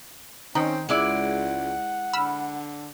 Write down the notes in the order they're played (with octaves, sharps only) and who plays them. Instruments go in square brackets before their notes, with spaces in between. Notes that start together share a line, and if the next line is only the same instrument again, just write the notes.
[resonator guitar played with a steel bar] D#3 [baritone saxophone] C4 [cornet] C#4 [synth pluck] D#4
[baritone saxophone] C#2 [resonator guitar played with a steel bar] G#3 E4 D5 [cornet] F#5
[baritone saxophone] D3 [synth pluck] B5 E6 F6